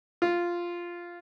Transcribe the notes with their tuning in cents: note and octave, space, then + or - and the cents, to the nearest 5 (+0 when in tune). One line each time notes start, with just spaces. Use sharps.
F4 -5